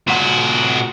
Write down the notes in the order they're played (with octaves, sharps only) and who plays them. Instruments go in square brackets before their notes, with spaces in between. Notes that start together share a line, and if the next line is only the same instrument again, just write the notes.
[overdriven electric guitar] A#2 F#4